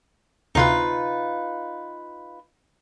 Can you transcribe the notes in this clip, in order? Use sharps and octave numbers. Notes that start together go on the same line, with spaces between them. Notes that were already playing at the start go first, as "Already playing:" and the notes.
D2 C3 D#4 F4 B4